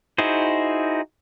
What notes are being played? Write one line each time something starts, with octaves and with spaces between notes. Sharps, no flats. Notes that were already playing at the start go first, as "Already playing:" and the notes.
D#4 E4 F#4 G#4 C5